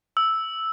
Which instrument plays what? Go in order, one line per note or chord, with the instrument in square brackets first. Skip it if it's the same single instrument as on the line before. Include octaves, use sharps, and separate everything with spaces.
[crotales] E6